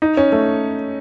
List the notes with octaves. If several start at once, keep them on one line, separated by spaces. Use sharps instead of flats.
D#4
C#4
A3